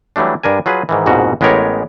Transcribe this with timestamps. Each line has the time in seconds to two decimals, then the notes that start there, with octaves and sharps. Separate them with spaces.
0.16 E3 F#3 G3 A3 D4
0.43 G2 D4 A#4 G#5
0.66 F#3 F4 G#4 B4
0.89 G#2 D#3 E3
1.06 A#1 F2 G#2 B2 F#4
1.41 A1 G#3 B3 G4 A#4 C#5